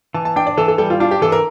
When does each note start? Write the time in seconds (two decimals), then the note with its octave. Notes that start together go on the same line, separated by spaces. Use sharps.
0.14 E3 A5
0.25 A5
0.36 D4 G5
0.47 D5
0.57 E3 A4
0.68 A4
0.78 G3 A4
0.90 F4
1.00 D4 F4
1.11 G4
1.22 E3 A4
1.32 A#4